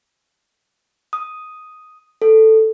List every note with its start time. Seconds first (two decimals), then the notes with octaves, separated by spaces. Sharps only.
1.13 D#6
2.22 A4